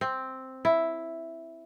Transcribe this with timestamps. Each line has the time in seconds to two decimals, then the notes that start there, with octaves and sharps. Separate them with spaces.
0.01 C4
0.65 E4